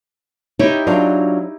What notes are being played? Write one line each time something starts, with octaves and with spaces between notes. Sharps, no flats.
D#4 E4 G4 C#5
F#3 D4 F4